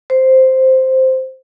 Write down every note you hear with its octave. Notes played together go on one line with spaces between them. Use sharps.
C5